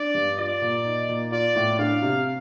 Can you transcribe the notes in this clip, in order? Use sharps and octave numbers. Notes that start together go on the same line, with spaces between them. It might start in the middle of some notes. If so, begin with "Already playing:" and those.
Already playing: D4 D5
G2
F4 D5
A#2
D#4
A#2
F4 D5
A2
D4 F5
C3